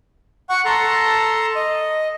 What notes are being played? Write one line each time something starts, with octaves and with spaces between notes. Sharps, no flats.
F#5 C#6
A4 A5 A#5 C6
D#5